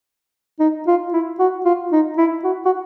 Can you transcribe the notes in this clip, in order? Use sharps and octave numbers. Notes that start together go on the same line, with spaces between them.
D#4
F4
E4
F#4
F4
D#4
E4
F#4
F#4